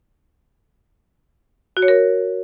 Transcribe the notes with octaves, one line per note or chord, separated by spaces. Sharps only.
F#4
C#5
A#4